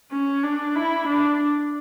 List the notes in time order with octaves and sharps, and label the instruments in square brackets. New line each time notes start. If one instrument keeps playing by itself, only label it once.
[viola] C#4
D4
E4
D4